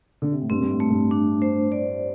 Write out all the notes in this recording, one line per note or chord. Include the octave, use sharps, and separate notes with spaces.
D3
C3
A2
G2 C4
G2
A2
A3
G2
D4
C5
D5